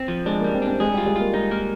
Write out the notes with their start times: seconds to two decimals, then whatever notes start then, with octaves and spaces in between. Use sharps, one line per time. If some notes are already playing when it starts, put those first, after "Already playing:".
Already playing: C4
0.08 F3
0.26 G#3 D4
0.41 A#3
0.44 G3
0.54 C4
0.62 D4
0.67 C4
0.80 G#3 G#4
0.94 G3
0.98 F4
1.06 G#3
1.16 A#3 F4
1.33 G#3 D#4
1.51 A#3